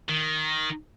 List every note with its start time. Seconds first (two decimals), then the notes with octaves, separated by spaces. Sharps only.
0.09 D#3